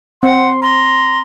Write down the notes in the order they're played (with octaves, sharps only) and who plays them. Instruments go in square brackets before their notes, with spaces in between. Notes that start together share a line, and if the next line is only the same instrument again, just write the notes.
[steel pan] C4 [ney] F#5 [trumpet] C6
[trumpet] A#5 [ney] C6